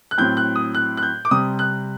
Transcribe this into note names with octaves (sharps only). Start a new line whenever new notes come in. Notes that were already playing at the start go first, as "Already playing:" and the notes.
F#6
A2 F#3 C4 G6
F#6
D#6
F#6
F#6
G6
D6
C3 G3 C4 D#6
F#6